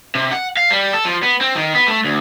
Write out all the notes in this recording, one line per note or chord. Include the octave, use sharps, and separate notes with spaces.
C3
F#5
F5
G3
A4
F3
B3
C4
D#3
B3
A3
D2